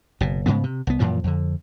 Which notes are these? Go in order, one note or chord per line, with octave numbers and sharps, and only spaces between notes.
F#1 B2
G#2 C#3 G#3 B3
C3
C2 B3
F#2 A#2 E3 F3
F2 D3